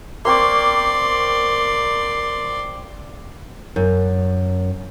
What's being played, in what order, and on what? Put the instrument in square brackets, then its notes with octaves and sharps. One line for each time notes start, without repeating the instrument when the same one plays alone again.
[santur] A#3 C4 C#6 [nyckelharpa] D5 C6
[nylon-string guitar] F#2